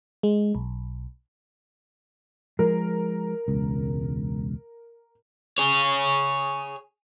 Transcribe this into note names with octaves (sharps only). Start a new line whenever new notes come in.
G#3
B1
F3 G#3 A#4
E1 C#2
G#4 C#5